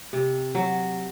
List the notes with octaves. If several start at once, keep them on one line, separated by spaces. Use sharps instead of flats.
C3
F#3